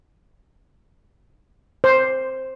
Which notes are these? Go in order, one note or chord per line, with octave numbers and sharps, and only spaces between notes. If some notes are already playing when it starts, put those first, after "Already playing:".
C5